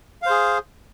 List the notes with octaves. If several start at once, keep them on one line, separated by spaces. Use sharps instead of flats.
G#4 C5 F5